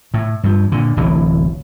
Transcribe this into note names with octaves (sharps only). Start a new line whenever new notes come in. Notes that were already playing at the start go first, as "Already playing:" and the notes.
A2
G2 F3
A#2 D3
D1 A1 C3 E3